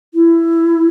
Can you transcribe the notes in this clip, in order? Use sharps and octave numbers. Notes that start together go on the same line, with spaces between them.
E4